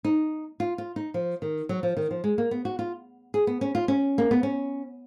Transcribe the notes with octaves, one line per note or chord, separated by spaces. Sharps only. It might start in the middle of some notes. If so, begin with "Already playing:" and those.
D#4
F4
F4
D#4
F3
D#3
F#3
F3
D#3
F3
G#3
A#3
B3
F#4
F4
G#4
B3
C#4
F4
C#4
A#3
B3
C#4